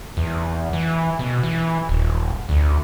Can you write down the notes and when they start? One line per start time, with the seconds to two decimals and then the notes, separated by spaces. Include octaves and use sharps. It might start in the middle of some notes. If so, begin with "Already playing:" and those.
0.17 E2
0.73 E3
1.19 B2
1.43 E3
1.89 D#1
2.49 D2